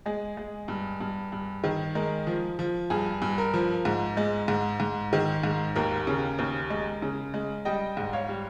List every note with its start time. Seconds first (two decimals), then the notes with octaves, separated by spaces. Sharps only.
0.06 G#3 G#4
0.37 G#3
0.68 G2
1.00 G2
1.32 G2
1.64 D#3
1.95 G#3 A#4
2.27 F3
2.59 F3
2.90 G2 G#4
3.22 G2
3.38 A#4
3.54 F3
3.85 G#2
4.17 G#3
4.48 G#2
4.80 G#2
5.13 D#3
5.43 G#2
5.76 D#2 A#4
6.07 C#3
6.39 D#2
6.70 G#3
7.02 C#3
7.34 G#3
7.65 G3 D#5 G5
7.97 G#2
8.13 C#5 F5
8.29 G3